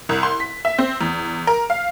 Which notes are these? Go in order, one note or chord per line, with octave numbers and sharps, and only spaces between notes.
C2
C6
B6
E5
C4
E2
A#4
F5